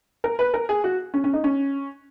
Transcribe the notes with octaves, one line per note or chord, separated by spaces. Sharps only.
A#4
B4
A#4
G#4
F#4
C#4
C#4
D#4
C#4